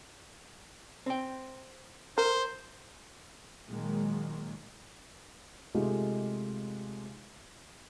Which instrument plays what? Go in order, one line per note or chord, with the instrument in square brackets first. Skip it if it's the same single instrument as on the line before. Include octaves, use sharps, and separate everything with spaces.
[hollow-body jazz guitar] C4 G5
[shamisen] A#4 [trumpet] C5
[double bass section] A#2 D#3 F#3 G#3 A#3
[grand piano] C3 G#3 A3 D#4 F4 G4